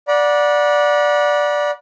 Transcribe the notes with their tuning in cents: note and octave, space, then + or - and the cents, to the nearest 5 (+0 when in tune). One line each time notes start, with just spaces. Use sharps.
D5 +0 F#5 -25 B5 -40